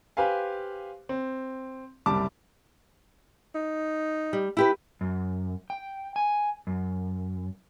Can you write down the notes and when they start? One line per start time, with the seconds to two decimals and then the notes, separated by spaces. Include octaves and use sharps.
0.17 G4 B4 C5 F5 G#5
1.09 C4
2.06 F#1 C2 G3 A5 D6
3.55 D#4
4.33 G3
4.57 E4 G4 B4
5.01 F#2
5.70 G5
6.16 G#5
6.67 F#2